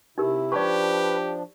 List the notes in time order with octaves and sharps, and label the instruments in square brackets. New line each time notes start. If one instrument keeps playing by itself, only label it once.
[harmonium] C3 E4 [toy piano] D#4 G4 A#4
[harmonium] F3 D4 [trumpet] G4 [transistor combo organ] B4 [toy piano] D5 A5 C#6